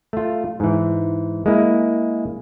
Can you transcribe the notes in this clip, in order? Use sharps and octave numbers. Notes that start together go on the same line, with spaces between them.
A3 F4
G#2 E3
G#3 A#3 E4